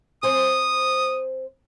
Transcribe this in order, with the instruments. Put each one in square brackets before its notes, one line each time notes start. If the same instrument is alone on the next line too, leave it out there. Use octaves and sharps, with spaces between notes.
[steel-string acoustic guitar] C4 C5 G#5 [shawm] D#6